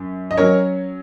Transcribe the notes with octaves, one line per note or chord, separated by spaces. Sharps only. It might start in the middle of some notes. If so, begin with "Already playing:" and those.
Already playing: F#2
D#5
F#3 C#4 A#4 C#5